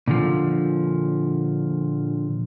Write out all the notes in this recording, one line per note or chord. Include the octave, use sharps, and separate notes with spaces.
A#2 D3 F3